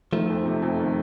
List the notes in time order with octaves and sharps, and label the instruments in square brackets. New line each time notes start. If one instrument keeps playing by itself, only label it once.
[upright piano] D#3 [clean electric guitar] F3 A3
[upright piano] F2
C3
F2
D#3